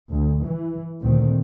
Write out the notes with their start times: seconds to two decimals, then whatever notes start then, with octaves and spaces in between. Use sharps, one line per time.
0.10 D2
0.45 E3
1.02 D2 A#2 D#3 C4